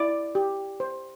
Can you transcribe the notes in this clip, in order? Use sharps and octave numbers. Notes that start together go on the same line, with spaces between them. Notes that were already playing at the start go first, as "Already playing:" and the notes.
Already playing: E4 D5 D6
G4
C5